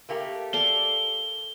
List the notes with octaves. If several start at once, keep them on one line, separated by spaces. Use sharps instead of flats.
A3 A#3 G4
A4 D5 F5 G7